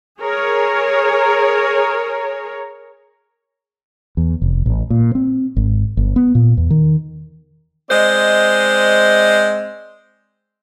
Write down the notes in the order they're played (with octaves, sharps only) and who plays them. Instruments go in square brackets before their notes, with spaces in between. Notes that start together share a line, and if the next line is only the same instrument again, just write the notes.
[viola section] G#4 A#4 C#5
[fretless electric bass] E2
F1
A1
A#2
C4
G#1
G1
B3
A#2
E2
D#3
[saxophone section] G#3 C4 C5 D5 D#5